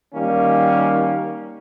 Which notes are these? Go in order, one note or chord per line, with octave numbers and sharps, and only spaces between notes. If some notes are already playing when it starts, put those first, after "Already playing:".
D#3 G3 A#3 C#4